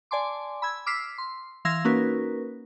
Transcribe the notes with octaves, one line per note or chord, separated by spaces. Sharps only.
D5 G#5 A5 C6 D6
B5 E6 G#6
D6 E6 F6 B6 C7
C6
E3 F5 C6 E6 G#6 A#6
A#3 C#4 D#4 F#4 A#4 B4